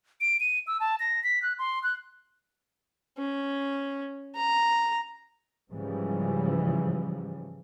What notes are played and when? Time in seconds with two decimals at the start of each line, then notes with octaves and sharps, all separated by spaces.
0.21 D7
0.40 D#7
0.67 E6
0.80 A5
1.00 A#6
1.24 B6
1.42 F#6
1.59 C6
1.83 F#6
3.18 C#4
4.36 A#5
5.71 G#2 C#3 E3 F3 G3